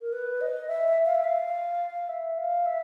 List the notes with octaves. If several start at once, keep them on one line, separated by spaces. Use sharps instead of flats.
A#4
B4
D#5
E5
F5
E5
F5
E5
F5
E5